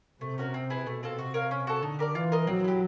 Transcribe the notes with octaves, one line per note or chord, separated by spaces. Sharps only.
C3 A3
C#4 F#4 A#4
C4
E4 G#4 B4
B2 A3
C4 F4 A4
C3 F#4
A#4 C#5 F5
C#4
F#4 A4
D3 D#4
G4 A#4 D5
E3 F4
A#4 D#5
F#3 C4
E4 G4